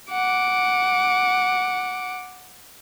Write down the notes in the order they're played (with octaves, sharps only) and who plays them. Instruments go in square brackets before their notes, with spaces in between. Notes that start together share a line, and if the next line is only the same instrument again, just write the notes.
[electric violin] F#5 D6